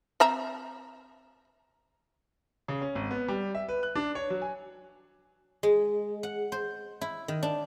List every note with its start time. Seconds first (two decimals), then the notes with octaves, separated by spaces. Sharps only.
0.20 C4 E5 A#5
2.68 C#3
2.81 C#4
2.95 G#1
3.11 B3
3.28 G3
3.55 E5
3.69 B4
3.83 F#6
3.95 D4
4.15 C#5
4.30 F#3
4.42 G#5
5.63 G#3
6.23 F#5
6.52 C5
7.01 E4
7.28 D#3
7.43 D4